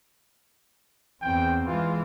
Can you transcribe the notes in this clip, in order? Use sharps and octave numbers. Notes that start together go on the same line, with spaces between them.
E2 C4 G5
E3 G#3 F4